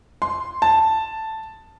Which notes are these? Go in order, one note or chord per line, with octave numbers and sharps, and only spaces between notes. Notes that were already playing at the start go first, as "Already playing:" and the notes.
C6
A5